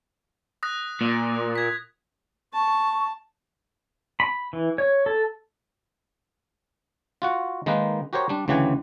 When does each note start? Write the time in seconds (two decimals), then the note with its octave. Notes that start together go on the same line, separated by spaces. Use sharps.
0.63 D#6 F#6 A#6
1.01 A#2
1.56 G#6 B6
2.54 A5 C#6
4.20 B5
4.53 E3
4.78 C#5
5.06 A4
7.22 F4 F#4 F#5
7.66 D#3 G#3 A#3 D#4 B4
8.13 F#4 G4 A#4 C5 C#5
8.29 G3 D4
8.48 D2 C#3 E3 G4 F#5 G#5